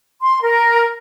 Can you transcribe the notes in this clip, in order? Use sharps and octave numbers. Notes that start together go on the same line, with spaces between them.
C6
A#4